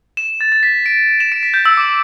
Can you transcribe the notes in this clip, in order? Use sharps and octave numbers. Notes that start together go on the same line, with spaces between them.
E7
A6
A6
B6
D7
D7
E7
D7
B6
G6
E6
D6